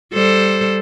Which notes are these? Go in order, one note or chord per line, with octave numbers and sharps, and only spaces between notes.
G3 A4 C5